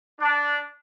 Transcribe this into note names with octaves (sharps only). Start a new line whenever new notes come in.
D4